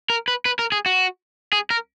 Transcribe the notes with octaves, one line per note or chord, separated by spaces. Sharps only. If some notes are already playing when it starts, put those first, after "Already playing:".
A#4
B4
B4
A#4
G#4
F#4
G#4
A#4